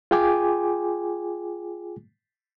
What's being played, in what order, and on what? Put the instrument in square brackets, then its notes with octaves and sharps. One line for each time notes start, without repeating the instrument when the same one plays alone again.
[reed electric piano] F4 G#4 G5 G#5 D6